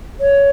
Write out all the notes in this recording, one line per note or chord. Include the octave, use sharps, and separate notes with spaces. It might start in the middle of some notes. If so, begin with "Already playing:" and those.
C#5